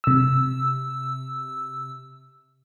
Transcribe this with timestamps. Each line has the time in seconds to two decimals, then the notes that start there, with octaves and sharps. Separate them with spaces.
0.04 C3 E6